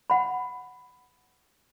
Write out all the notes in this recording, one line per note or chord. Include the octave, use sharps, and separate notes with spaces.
F#5 B5